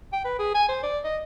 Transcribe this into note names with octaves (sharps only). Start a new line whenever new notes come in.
G5
B4
G#4
G#5
C5
D5
D#5